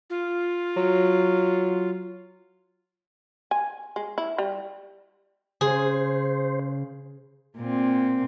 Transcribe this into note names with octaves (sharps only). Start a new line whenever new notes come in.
F4
F#3
G#5
G#3
E4
G3
C#3 G#4 C5
A#2 C4